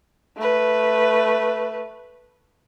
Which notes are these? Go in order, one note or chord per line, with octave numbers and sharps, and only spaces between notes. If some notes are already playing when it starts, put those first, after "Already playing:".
A3 B4